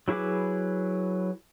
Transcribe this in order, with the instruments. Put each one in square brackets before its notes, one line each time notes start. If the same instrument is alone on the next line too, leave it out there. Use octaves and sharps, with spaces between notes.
[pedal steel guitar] F#3 E4 G#4 B4 D6